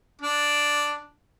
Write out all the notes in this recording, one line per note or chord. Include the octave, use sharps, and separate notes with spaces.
D4